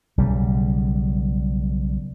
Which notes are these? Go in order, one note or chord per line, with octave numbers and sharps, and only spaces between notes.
B1 C#3 G3